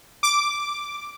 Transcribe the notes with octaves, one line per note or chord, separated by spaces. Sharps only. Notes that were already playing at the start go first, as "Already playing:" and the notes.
D6